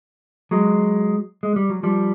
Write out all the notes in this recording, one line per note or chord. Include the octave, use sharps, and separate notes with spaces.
F#3 G#3
G#3
G3
F#3
F3 G3